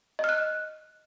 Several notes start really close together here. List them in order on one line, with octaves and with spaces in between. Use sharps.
D#5 F6 F#6